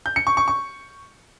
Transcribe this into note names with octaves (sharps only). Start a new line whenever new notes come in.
G6
C#7
C#6
C#6
C#6